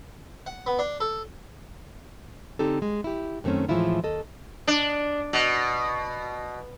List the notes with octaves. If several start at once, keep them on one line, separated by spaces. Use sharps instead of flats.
F#5
B3
D4
A4
D3 C4 D#4 G4 A4
G#3
E4 G4
F#2 D#3 A3 A#3 C4 C#4
A2 E3 F3 G#3 E4 F4
D#2 A4 D#5
D4
B2